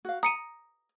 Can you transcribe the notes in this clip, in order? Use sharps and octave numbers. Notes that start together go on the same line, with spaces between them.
F#4 F5
A#5 D#6 C#7 D#7